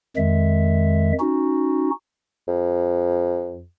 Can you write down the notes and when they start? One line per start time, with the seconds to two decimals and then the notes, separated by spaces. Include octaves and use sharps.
0.16 F2 D#3 G#3 E5
1.20 C#4 D#4 F#4
2.48 F2